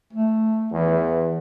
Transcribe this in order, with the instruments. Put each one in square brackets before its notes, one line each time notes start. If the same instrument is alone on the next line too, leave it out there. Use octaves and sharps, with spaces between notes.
[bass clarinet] A3
[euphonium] E2 [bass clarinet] E3